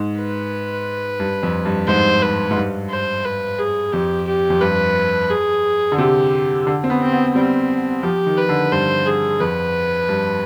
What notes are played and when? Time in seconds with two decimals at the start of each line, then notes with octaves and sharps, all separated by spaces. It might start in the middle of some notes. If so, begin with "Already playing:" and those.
Already playing: G#2
0.17 B4
1.20 G2
1.43 F2
1.65 G2
1.88 G#2 C5
2.22 B4
2.51 G#2
2.57 G2
2.90 C5
3.25 B4
3.59 G#4
3.93 F2 G4
4.27 G4
4.50 F2
4.61 G2 B4
5.30 G#4
5.92 D3
5.98 C3 G4
6.67 D3
6.84 C4
6.90 B3
7.01 C4
7.13 B3
7.34 G3 C4
8.03 F3 G4
8.27 D#3
8.38 B4
8.49 D3
8.72 G2 C5
9.06 G#4
9.40 F2 B4
10.09 G2